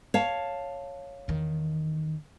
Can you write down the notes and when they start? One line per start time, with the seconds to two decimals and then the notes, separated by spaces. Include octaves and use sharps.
0.14 C#5 F5 A5
1.28 E2 D#3